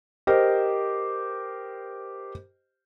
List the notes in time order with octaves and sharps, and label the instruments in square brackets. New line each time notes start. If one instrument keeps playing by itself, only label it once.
[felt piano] G4 A#4 C5 D#5